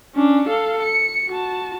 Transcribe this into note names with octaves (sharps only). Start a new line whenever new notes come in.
C#4 D4
A4 F5
C#7
F#4 A5